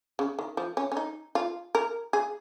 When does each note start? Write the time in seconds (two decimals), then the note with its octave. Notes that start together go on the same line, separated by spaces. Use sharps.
0.19 C#3
0.39 D#3
0.57 F3
0.77 C#4
0.92 C#4
0.97 D#4
1.35 F4
1.75 A#4
2.13 G#4